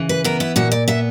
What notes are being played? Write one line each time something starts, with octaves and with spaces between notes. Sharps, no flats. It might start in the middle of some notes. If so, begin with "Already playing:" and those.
Already playing: C#3 E3
B4
B3 A#4
E4
A#2 F#4
D5
B3 E5